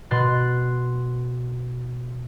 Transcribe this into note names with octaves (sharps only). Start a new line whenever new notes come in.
B2 C6 F#6 A6